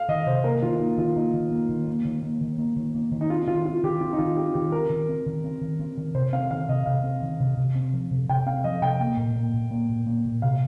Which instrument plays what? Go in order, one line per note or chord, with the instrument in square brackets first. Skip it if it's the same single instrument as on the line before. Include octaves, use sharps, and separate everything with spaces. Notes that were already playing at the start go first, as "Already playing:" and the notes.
Already playing: [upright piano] F5
[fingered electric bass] D#3 [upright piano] D#5
[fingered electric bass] C3 [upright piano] C5
[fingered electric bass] A#3 [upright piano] A#4
[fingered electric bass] D#3 [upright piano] F4
[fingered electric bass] A#3 [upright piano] D#4
[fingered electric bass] D#3 [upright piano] F4
[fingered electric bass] A#3 [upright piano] D#4
[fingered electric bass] D#3
A#3
D#3
A#3
D#3
A#3
D#3
A#3
D#3
A#3
D#3
[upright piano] D#4
[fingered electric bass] C4 [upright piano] F4
[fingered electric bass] D#3 [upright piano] F4
[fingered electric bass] C4 [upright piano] F4
[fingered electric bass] D#3 [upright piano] G4
[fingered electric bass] C4 [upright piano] F4
[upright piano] D#4
[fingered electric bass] D#3 [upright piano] F4
[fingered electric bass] C4 [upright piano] G4
[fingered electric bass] D#3 [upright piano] G4
[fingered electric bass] C4 [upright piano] A#4
[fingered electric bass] D#3
C4
D#3
C4
D#3
C4
D#3
[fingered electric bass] C3 [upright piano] C5
[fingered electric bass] C4 [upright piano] F5
[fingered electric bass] D#3 [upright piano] F5
[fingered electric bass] C3 [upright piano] D#5
[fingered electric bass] C3 [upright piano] F5
[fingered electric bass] C4
D#3
C3
C3
C4
F3
C3
[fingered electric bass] C3 [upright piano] G5
[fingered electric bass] C4 [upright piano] F5
[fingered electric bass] F3 [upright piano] D#5
[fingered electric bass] C3 [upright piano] G5
[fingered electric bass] A#3
A#2
A#3
A#2
A#3
A#2
A#3
A#2
[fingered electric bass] C3 [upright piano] F5